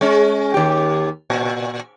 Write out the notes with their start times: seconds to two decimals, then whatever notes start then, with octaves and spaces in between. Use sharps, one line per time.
0.01 G#3 C#4
0.54 D#2 G4
1.30 A#2